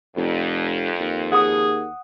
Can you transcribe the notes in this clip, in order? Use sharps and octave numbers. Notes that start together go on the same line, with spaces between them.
F1 F2
D#2
G#4 F#5 D#6